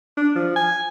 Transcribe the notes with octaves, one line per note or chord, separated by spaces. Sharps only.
D4
F3
G#5